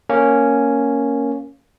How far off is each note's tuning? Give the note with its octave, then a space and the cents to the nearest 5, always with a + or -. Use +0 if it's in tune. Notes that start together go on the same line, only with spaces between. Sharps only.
A#3 +0 C#4 +0